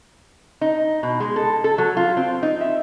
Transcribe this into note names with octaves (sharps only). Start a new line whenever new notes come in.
D#4
B2
G#3
A4
A4
F#3
F4
C4
D#4
E5